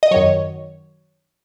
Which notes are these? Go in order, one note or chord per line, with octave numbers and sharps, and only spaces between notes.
D#5
F#2 D#3 F#3 C#5